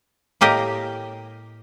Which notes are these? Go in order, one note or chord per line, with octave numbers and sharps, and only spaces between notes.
A2 A#3 G4 A#4 D#5